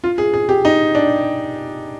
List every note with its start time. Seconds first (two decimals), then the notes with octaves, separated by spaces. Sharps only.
0.04 F4
0.18 G#4
0.34 G#4
0.49 G4
0.65 D#4
0.95 D4